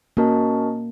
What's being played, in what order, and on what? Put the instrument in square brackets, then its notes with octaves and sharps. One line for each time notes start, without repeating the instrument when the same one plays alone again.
[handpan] A#3 [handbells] C#4 F#4 A#4 D#5 A5